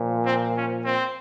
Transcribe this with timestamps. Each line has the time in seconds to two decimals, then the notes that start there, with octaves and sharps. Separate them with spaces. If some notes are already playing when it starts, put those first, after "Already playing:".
Already playing: A#2 F3
0.25 C4
0.54 C#4
0.83 C4